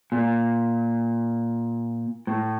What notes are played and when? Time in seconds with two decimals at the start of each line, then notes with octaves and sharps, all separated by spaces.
0.12 A#2
2.27 A2